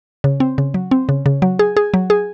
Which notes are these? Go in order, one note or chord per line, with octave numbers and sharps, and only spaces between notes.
C#3
C4
C#3
F#3
C4
C#3
C#3
F#3
G#4
G#4
F#3
G#4